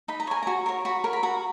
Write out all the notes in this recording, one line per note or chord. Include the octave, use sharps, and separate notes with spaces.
D#4 B5
A#5
A#4 C#5 G#5
F#4 A#5
A#4 C#5
F#4 B5
A#4 C#5
B5
F#4 A#5